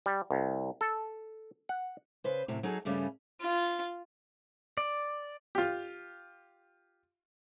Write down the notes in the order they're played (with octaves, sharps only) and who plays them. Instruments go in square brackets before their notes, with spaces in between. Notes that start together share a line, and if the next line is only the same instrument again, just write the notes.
[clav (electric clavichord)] G3
C2
A4
F#5
[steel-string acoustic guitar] C#3 B4 C5
F#2 A2 C3
F#3 D#4 G#4 A4
G2 C#3 G3 A3 C#4
[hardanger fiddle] F4
[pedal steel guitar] D5
[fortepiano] F4 G4